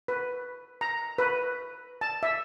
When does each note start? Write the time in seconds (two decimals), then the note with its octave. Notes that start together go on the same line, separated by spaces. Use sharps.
0.08 B4
0.81 A#5
1.18 B4
2.01 A5
2.23 E5